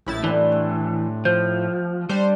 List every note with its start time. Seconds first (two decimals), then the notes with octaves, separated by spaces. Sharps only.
0.06 A#1 F#2 A2 E4 A6
0.24 A2 E3 G3 C4 D4
0.52 A3
1.25 F3 C5 G6
2.09 G3 D4 C5